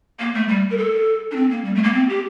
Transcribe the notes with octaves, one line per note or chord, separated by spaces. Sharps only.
A#3
A3
G3
A#4
A4
D4
C4
A#3
G3
A3
A#3
C4
G4